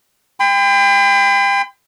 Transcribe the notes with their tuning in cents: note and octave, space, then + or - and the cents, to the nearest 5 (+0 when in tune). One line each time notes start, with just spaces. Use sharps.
G5 +30 B5 +45